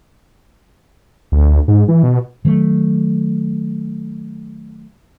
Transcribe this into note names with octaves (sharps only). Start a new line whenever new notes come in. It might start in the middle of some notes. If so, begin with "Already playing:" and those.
D2
G#2
E3
B2
D#3 F#3 G3 A3